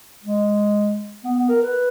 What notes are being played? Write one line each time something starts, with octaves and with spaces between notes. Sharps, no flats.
G#3
B3
B3
A#4
B4